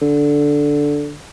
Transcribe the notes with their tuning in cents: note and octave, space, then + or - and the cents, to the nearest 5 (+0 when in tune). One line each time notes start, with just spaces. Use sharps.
D3 -5